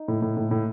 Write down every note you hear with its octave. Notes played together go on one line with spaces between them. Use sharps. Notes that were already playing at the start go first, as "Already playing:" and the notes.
Already playing: D#4
A2
A2
A2
A2